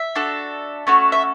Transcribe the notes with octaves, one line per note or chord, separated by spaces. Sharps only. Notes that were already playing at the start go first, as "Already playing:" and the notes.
Already playing: E5
D4 F#4 A4
A3 C#4 F#4 A4
E5